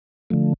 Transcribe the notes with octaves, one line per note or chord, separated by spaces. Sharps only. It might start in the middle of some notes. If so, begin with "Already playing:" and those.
D3 F3 A3